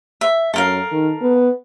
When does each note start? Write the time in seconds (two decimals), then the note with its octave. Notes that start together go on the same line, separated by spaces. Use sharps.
0.21 E5
0.54 F#2 A4 A#4 F5
0.92 D#3
1.21 B3